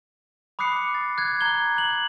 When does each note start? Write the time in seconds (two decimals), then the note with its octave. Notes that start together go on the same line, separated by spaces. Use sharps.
0.59 B5 D6 D#6 F#6 C7 C#7
0.94 A6
1.18 F#6 G#6
1.41 A#5 G#6 G7
1.77 F#6 F#7